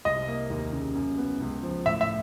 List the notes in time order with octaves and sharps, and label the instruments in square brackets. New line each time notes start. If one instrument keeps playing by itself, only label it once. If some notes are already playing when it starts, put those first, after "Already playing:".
[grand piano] C2 [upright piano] D#5
[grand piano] A#3
D#2
C#3
F#2
B3
C#2
F3
[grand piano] A2 [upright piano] E5
[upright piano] E5